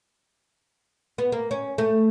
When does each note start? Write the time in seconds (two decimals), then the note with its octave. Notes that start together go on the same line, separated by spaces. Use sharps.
1.18 B3
1.32 A#3
1.51 C#4
1.78 A3